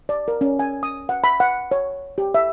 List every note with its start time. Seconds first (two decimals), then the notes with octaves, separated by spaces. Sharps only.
0.09 D5
0.28 A#4
0.41 C#4
0.59 G#5
0.83 D#6
1.09 F#5
1.24 B5
1.40 F#5
1.71 C#5
2.18 G4
2.34 E5